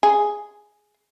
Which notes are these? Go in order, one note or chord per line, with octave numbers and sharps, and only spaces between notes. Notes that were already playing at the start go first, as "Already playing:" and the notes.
G#4